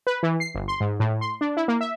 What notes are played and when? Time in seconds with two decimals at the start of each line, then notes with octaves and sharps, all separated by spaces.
0.07 B4
0.23 E3
0.40 C7
0.55 G1
0.68 C6
0.80 G#2
1.00 A2
1.21 C6
1.41 D4
1.57 E4
1.68 A#3
1.81 E5